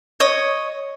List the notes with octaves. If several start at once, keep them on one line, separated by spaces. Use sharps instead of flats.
C#5 D#5